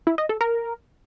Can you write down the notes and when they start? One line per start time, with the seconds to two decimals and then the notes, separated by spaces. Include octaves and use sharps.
0.07 E4
0.18 D#5
0.29 A4
0.41 A#4